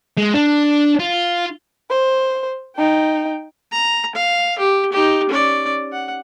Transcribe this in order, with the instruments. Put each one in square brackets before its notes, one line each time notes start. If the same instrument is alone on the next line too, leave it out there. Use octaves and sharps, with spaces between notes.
[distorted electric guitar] G#3
D4
F4
[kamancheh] C5
D#4 G5
[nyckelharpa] A#5
F5
G4
D#4 G4
C#4 D5
F#5